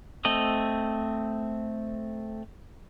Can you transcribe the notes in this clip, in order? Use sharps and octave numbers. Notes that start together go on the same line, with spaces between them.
A3 C4 D#5